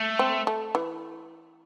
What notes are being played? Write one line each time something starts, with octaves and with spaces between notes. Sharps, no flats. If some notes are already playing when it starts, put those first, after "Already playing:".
Already playing: A3
C4
A3
E3